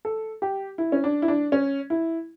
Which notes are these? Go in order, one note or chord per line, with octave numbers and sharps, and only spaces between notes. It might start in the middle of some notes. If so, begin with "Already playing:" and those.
A4
G4
E4
C#4
D4
E4
D4
C#4
E4